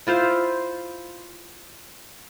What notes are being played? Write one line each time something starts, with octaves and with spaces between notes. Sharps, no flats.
E4 F4 C5 F5